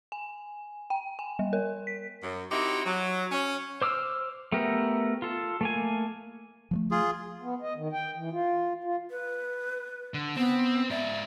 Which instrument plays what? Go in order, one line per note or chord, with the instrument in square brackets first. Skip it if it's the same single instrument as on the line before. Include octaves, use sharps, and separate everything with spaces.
[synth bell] G#5
G5
G#5
G3
A#4
B6
[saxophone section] F#2
C4 D#4 E4 F#4 G4
F#3
C#4
[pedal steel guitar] C5 D6 E6 F6
A3 B3 G4 A#4
F4 A4
A3 A#3 G#5
[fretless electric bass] F3 F#3 A3
[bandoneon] F4 G#4
[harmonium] B3
D#5
D#3
G5
E3
F4
F4
[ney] B4
[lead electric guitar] D3
[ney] B3 [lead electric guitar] C4
[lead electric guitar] G#2 D5 [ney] E5